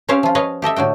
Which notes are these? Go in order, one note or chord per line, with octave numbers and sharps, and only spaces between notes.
C4 C#4 G4 C5 C#5 F5
F3 F4
B4 C#5 D#5 F5
G4 A4 D#5 E5
A2 D3 F#4 G5